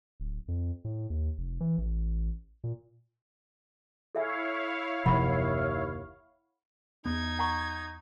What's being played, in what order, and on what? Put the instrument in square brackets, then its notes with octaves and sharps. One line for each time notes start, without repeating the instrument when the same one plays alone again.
[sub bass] D1
F2
A2
D#2
F1
E3
A1
A#2
[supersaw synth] E4 C#5 F5 [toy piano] A4 E5 G#5
[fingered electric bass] F#1 C3 F3 [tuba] D#2 [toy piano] F#5 B5
[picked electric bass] E2 B3 [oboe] D#4 [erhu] G#6
[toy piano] F#5 A#5 C#6